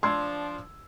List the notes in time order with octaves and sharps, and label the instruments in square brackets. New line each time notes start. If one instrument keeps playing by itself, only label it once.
[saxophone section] F3 D4 [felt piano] C6 E6 G#6